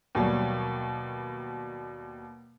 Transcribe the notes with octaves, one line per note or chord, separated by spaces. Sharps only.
D#2 B2 F#3 G3